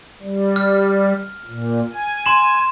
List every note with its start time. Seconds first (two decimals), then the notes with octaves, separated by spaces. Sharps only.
0.21 G3
0.56 F6
1.46 A#2
1.93 G#5
2.26 C6 E7